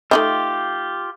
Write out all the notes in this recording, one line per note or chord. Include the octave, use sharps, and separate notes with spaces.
A3 D#4 F4 G4 D#5